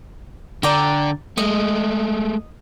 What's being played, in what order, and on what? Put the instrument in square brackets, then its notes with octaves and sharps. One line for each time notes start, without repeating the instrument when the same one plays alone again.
[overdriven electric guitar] D3 D4 [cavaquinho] D5 G5 A#5
[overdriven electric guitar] G#3 A3 [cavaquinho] D#5